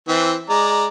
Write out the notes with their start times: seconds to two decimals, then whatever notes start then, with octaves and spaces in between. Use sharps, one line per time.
0.08 E3 C4
0.49 G#3 D5 A#5